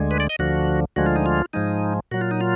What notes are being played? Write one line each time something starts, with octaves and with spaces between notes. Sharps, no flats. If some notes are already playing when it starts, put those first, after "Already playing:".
Already playing: D2 D3 G#3
B4
D5
D#5
D2 D3 F3 F#4
D2 D3 F3 G#3 F#4
F4
D#4
F4
G#2 F3 G#3 D#4
A#2 F#3 F#4
F4
D#4
F4